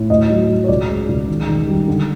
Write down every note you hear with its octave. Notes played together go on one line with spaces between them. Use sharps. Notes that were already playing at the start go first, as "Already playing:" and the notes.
Already playing: A2
D2 D#5
F#3
F#3
C#5
C#2 D5
G#3
C#2
D#3
D#3
G3
D3